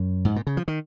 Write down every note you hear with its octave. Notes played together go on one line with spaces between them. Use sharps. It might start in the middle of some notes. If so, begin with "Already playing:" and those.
Already playing: F#2
G#2
A#2
C#3
F3
D#3